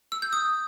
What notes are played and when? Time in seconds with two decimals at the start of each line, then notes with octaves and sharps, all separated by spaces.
0.12 E6
0.22 G6
0.33 D#6